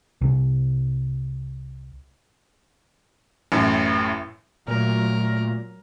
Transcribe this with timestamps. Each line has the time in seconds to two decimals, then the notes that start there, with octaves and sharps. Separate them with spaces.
0.21 C2 C3
3.52 A1 F#2 A2
4.68 A#2 F#3 A3 A#4